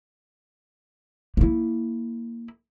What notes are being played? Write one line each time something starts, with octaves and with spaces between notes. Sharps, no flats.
A#3 E4